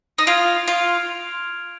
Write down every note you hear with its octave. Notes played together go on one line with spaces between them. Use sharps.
D#4
F4 F6 G#6 D7 F7
F4